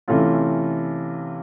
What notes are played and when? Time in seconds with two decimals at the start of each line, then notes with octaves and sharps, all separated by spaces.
0.08 C3 E3 A3 C#4 F4